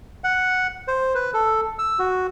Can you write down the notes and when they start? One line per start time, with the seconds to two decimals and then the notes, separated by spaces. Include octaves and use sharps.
0.24 F#5
0.88 C5
1.15 B4
1.34 A4
1.79 E6
1.99 F#4